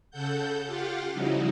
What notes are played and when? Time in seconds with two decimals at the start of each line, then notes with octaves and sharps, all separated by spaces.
0.11 C#3 A4 F#5 G6
0.66 F4 G4 F5 F#5
1.14 C#3 F3 G3 D#4 E4 F#4